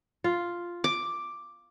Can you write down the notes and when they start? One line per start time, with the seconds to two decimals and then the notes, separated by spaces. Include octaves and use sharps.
0.24 F4
0.84 D6